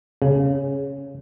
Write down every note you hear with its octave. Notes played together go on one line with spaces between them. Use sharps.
C#3